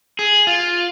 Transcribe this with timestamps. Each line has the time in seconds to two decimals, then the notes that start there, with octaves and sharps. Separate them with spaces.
0.19 G#4
0.47 F4